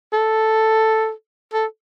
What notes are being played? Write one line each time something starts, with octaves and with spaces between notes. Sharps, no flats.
A4
A4